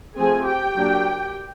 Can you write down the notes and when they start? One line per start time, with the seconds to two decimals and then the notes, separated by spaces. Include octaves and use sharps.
0.17 F3 A3 C4 G#4 G#5
0.46 G4 G5
0.75 F#3 A#3 D4